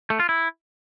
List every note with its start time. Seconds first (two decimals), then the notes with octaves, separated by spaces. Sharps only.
0.10 A3
0.20 F4
0.29 E4